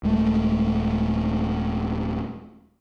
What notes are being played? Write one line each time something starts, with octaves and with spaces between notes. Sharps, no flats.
D#1 G#3 A3